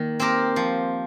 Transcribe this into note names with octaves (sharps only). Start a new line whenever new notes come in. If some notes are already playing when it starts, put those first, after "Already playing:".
Already playing: D#3 A#3
C4 G4 A#4
F3